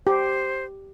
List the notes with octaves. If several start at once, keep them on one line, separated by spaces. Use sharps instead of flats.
G4 C5